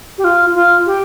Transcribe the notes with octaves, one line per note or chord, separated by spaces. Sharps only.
G4
F4
F4
G4